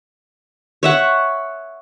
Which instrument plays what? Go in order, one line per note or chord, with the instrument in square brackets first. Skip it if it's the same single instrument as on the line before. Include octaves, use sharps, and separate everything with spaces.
[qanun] C#5 E5 F#5